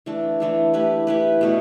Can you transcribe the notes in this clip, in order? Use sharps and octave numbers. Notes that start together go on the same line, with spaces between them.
E3 A3 D4 A4
E3 A3 D4 A4
A3 E4 G4 B4
A3 E4 G4 B4
B2 A3 D4